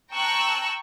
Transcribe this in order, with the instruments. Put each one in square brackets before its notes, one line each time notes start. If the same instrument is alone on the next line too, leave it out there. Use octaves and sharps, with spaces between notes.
[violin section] G5 A5 A#5 C#6 E6 F#6